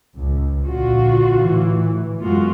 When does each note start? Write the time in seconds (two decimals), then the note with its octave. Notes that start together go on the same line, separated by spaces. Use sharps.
0.16 C#2
0.67 A#1 D3 F4 F#4
1.35 A2 E3
2.21 F#2 G#3 B3 F4 F#4